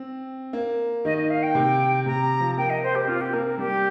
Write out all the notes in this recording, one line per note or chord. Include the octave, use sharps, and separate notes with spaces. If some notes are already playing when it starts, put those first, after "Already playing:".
Already playing: C4
A#3
D#3 D#5
D#5
F5
G5
C3
C3 A#5
F3
A#3 G5
D#5
C5
G4
C4 F4
G4
A#3 A#4
A#4
G3 G4